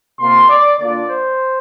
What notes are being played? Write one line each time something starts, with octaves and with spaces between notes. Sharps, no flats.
C3 A#3 F4 C6
D5
D3 A#3 D4 F4 D5
C5